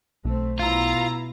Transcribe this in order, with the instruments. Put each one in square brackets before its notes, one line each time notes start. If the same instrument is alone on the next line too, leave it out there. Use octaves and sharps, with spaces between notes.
[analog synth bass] B1 [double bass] A3 C4
[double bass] B2 E4 [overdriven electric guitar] F4 [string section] A#5